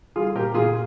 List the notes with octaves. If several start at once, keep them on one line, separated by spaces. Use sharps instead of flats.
G3 F4 G#4
A#2 G4 A#4
A#2 F4 G#4